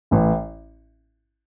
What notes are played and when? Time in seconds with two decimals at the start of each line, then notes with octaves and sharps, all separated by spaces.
0.11 A1 A2